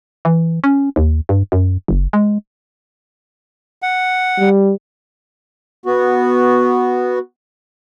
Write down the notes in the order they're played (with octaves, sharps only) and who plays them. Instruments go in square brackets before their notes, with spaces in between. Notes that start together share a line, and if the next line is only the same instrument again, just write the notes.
[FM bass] E3
C#4
D#2
G2
F#2
F#1
G#3
[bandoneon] F#5
[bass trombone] G3
[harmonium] B3 F#4